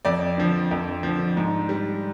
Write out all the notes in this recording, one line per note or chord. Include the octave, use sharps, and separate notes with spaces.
F2 D5
D3 F3
F2
D3 F3
G#2
G3